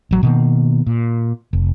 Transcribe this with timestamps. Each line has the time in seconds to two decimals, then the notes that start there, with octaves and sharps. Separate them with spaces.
0.11 A1 F#3
0.23 B2 D#3 A#3
0.87 A#2
1.53 F1